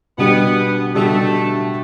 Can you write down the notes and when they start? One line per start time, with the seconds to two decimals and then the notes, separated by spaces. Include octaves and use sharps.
0.18 B2 G3 B3 D4 G4
0.94 B2 G3 A3 D4 G4